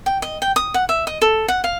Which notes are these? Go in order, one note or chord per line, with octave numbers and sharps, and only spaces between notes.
G5
D#5
G5
D#6
F#5
E5
D#5
A4
F#5
F5